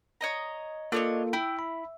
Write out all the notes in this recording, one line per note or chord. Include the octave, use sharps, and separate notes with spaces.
C#5 D#5 A#5
A#3 D4 F4 A4 C#5 D#5
E4 G5
B5